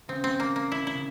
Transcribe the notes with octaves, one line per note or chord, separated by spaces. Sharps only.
C#3 C4
C4
A#3
A#3
E4
E4
C#3